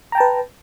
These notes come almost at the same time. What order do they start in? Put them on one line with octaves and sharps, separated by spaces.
A#5 G5 A5 B4